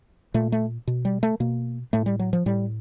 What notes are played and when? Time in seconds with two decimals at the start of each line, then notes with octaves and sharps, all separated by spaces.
0.34 A#2 A3
0.52 A3
0.87 B2
1.05 G3
1.23 A3
1.40 B2 A#3
1.93 A2 A3
2.06 G3
2.19 F#3
2.33 F3
2.46 A2 G3